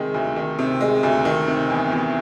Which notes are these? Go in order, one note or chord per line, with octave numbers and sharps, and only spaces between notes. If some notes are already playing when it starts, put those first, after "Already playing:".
Already playing: C3 D#3 G#3
D2
D#3
C3
G#3
D2
D#3
C3
E2
E2